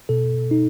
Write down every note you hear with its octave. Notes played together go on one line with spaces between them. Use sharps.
B2 A4
D#4